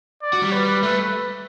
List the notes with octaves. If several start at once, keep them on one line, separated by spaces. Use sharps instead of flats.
D5
F#4
G3
B4
A3 B4